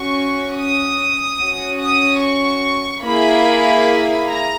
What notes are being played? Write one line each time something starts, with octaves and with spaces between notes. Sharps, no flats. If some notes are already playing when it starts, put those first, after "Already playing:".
Already playing: C#4 F#4 C#6
D#6
C#4 F#4
D#6
C#6
A#3 E4 G#4 B5
A#5